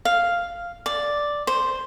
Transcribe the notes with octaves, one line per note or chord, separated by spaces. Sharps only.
F5
D5
C5